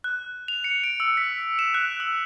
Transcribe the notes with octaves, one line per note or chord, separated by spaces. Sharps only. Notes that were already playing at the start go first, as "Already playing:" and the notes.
F#6
F7
C#7
D7
E6
B6
E7
F#6
E6